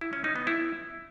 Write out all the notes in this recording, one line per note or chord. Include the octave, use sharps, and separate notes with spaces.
E4
C#4
D#4
B3
E4